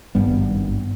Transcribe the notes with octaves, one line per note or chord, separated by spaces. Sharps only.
G#1 G2 G3 B3